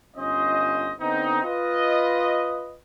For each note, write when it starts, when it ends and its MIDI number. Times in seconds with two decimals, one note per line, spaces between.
0.17 0.92 31
0.17 0.92 61
0.17 0.92 65
0.17 0.92 72
0.17 0.92 75
1.00 1.40 50
1.00 1.40 59
1.00 1.40 60
1.00 1.40 63
1.44 2.78 65
1.44 2.78 71
1.44 2.78 75